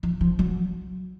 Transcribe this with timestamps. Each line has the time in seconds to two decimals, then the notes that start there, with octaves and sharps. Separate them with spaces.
0.03 F3
0.21 F3
0.39 F#3